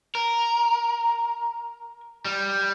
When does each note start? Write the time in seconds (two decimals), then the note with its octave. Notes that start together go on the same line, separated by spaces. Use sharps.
0.15 A#4
2.25 G3